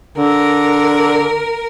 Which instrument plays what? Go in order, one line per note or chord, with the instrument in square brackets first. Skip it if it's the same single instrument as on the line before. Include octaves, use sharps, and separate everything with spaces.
[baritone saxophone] D3 [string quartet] A#4